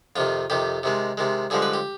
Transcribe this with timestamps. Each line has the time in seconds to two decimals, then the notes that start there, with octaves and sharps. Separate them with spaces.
0.16 F2 C3 D#3 F4
0.50 F2 C3 D#3 G4
0.83 C3 D#3 G#3
1.17 C3 D#3 G#3
1.50 G2 D3 F3 G#3 G#4
1.62 B4
1.74 G4